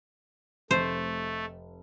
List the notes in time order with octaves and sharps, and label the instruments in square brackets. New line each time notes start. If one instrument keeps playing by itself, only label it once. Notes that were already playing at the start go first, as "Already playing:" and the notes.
[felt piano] F1 [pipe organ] A3 [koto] C5